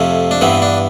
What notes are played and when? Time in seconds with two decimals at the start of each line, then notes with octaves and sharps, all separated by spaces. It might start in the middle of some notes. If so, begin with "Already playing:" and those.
Already playing: F2 C3 F3 A3
0.31 D4
0.41 G2 E3 B3 C4
0.62 D4